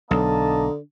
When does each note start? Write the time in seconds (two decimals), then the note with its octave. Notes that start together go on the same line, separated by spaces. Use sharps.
0.11 B1 D3 A#3 D#5 A5